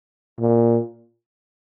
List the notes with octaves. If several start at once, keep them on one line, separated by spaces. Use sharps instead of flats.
A#2